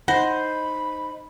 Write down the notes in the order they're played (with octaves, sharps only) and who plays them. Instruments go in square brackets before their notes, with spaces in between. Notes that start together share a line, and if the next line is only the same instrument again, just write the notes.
[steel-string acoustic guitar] D#4 [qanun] C5 [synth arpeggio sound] F#5 A#6 [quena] B5